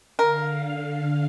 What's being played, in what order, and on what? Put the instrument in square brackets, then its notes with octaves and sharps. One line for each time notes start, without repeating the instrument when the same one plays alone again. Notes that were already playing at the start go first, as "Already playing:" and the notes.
[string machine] D3 F5 [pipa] A#4